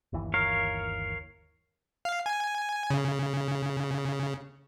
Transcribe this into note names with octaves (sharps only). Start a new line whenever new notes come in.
G1 D#2 E3
A#4 C#5 F5
F5
G#5
C#3